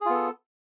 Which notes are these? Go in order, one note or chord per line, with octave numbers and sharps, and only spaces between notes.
B3 F4 G#4 A4